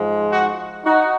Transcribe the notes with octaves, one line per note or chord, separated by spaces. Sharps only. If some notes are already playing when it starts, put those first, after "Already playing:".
Already playing: G#2 F3 G#3
D#4 F#4
D#4 F#4